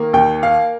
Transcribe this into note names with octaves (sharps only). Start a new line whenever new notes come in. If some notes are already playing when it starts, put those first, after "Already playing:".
Already playing: D#3 A#3
D#2 G5
F5